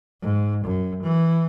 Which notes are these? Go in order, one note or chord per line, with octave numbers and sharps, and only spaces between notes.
G#2
F#2
E3